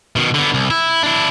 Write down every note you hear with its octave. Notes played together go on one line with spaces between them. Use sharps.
B2 D#3
D3 B3
C2
E4
D4 E4